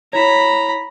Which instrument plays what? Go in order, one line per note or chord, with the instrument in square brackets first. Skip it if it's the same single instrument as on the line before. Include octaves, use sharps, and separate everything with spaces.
[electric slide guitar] E4 C#5 [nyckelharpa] A#5 B5